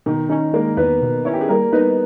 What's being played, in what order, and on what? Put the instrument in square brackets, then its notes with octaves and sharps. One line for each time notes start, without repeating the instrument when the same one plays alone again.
[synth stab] B2 [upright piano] D#3 D#4
[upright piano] D#3 D#4 [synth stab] C#4
[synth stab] G#3 [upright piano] A#3 A#4
[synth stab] E2 [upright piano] B3 B4
[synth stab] B2
[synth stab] C#4 [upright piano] E4
[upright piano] G4
G#4
[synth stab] G3 [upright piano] A#3 A#4
[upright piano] B3 B4 [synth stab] D#4